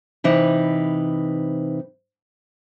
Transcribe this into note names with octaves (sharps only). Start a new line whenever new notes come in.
C3 E3 D#4 B4